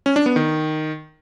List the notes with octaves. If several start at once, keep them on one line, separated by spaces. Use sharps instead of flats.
C#4
D4
B3
D#3